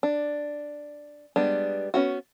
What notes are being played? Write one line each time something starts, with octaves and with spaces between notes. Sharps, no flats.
D4
G3 G#3 B3 D4
B3 C#4 F4 F#4